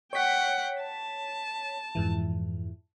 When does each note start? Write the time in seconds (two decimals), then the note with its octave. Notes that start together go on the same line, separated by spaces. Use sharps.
0.13 C#5 F#5 G5 B6
0.82 A5
1.95 F2 G#2 E3